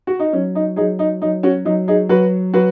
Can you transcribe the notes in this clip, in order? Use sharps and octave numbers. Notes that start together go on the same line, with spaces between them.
F#4
D#4
F#3 C#4
D#4
F#3 D#4 G#4
D#4
F#3 D#4
C#4 F#4
F#3 D#4
D#4 G#4
F#3 F#4 B4
F#3 F#4 B4